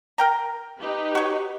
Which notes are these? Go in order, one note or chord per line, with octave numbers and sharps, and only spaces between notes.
A#4 G5 A#5
D#4 G4 B4
F#4 C#5